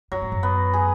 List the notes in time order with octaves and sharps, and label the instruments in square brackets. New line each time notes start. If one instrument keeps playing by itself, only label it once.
[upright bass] F#2 [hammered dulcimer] F#3
[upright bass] G#2
F#2
[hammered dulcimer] B3
G#4